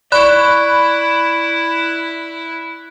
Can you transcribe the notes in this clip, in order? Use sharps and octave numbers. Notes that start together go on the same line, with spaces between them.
E4 D5 B5 C#6 F#6